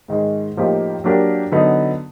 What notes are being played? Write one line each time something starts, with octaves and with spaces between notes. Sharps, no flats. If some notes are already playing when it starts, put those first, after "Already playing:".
G#2 D#3 G#3
A2 F3 A#3 D#4 G4
F#3 A#3 D4 G4 A#4
D3 F#3 B3 D#4